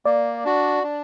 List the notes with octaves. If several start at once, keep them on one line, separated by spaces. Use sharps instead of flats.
A#3 D5
D4 F#4
D4